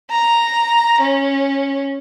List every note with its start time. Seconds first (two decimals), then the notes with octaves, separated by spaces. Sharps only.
0.11 A#5
1.01 C#4